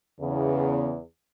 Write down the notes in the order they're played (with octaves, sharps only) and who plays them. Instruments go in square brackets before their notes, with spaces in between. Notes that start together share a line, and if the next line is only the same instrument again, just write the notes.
[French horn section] E2 [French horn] C#3